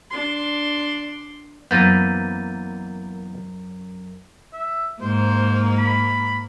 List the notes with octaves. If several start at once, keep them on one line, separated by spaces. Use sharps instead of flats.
D4 C6
F#2 E3 A#3 B3 C5 G6 A6 D#7
E5
G#2 A#3 C5
B5